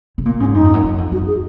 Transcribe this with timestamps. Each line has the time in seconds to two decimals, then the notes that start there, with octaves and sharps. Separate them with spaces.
0.18 C3
0.25 A#2 A#3
0.40 G#2 C#4
0.54 F#2 D#4
0.64 F2
0.74 F#2
0.84 F#2
0.98 F2
1.12 F#2 F#4
1.27 G#4